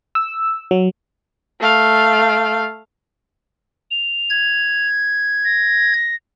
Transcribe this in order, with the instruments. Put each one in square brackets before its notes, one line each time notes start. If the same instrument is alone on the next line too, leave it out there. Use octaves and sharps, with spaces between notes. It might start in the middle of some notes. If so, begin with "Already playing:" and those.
[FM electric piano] E6
F#3
[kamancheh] A3 F5
[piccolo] F7
[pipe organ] G#6
[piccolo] A#6